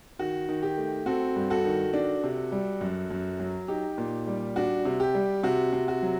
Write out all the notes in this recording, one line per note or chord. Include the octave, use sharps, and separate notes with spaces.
D#3 F#4
D#3
G4
A3
C4 F#4 A4
G2
F#4 A4
D#3
D4
C3
G3
F#2
F#2
F#3
D#4 G4
A#2
G3
D4 F#4
C3
G4
G3
C3 F#4
C3
F#4
F#3